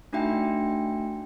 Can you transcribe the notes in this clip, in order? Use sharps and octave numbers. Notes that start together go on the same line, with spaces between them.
A3 D4 D#4 F#4 E5 G5